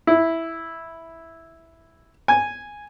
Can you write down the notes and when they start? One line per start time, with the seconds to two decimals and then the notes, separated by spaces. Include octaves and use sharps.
0.07 E4
2.28 G#5